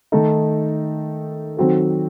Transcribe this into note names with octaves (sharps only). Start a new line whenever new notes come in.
D#3 A3 D#4 A4
D#3 F#3 C4 F#4 A4